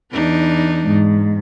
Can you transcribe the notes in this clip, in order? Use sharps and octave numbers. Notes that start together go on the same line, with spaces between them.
E2 D4 D#4
G#2